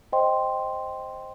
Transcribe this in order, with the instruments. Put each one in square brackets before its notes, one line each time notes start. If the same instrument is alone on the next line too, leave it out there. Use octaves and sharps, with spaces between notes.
[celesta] C5 D#5 G5 C6